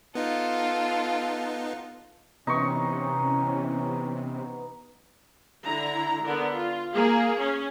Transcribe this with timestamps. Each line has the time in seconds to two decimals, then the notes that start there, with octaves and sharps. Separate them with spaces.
0.15 B3 D#4 F4 A4
2.47 C3 E3 B3 C#4 D#4 C6 C#6
5.64 D3 E4 A#5
6.23 D3 B3 A#4
6.53 F4
6.93 A#3 G#4
7.39 C#4